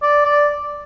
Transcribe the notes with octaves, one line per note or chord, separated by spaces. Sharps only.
D5
D5